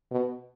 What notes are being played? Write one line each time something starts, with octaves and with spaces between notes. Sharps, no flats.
B2